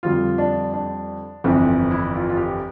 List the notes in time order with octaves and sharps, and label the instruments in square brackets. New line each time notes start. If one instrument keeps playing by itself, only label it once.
[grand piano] F2 D3 G3 [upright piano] F4
[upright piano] D4
D4
[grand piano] G1 F2 E3 [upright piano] C4
[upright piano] C4
E4
F4
F4
G4